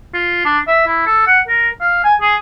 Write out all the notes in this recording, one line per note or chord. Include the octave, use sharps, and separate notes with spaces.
F4
D4
E5
E4
A4
F#5
A#4
F5
G#5
G#4